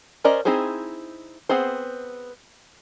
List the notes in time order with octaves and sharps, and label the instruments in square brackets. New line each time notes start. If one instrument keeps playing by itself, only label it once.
[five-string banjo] C#4 A#4 C5 D5 D#5
C4 D#4 E4 G#4 C5
B3 C4 G#4 C5